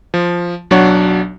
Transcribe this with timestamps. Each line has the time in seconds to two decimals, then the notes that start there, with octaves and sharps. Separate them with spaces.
0.14 F3
0.71 B1 F#3 D4 C#5 F#5